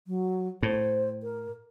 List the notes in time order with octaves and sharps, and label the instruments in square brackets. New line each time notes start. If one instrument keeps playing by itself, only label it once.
[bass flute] F#3
[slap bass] A2 [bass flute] C5
[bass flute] A#4